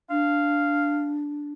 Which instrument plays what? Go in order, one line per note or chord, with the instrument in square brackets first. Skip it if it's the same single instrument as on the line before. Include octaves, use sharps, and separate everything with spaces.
[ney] D4 [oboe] F5